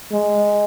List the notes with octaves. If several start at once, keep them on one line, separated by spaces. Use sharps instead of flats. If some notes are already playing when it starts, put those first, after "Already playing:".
G#3